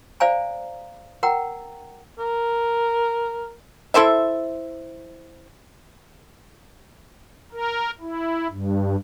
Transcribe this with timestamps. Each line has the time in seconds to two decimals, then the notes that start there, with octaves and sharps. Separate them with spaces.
0.20 C5 D5 F5 G#5 A#5
1.23 A#4 F#5 G5 A#5
2.19 A#4
3.94 E4 A4 C5 E5
7.52 A#4
8.01 E4
8.50 G2